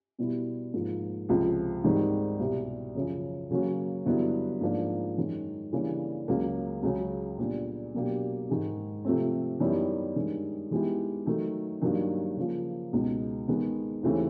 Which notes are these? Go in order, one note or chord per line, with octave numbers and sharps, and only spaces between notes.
B2 G3 B3 E4
G#2 F3 A#3
C#2 C3 F3
G#2 D#3 G3 C4
C2 B2 G3
F#2 C#3 F3
C#3 F#3 A#3 C#4 F#4
G2 D3 F#3 B3 E4
G#2 F3 A#3 D4 F4
F#2 D#3 G#3
C#3 E3 G3 A#3 D4
C#2 C#3 F#3 A#3
C#2 C#3 F#3
A#2 G3 B3 D4
B2 F#3 A#3 D4 G4
G#2 D#3 G#3
C3 F3 A3 C4
F#2 D#3 G3 B3 E4
G2 D#3 G#3
D#3 G#3 B3 E4 G4
D#3 F#3 A3
G2 D#3 F#3 A#3
C#3 F3 A#3
C#2 B2 G#3 B3 D#4
D#3 G#3 B3
D#2 C#3 E3 A3 C4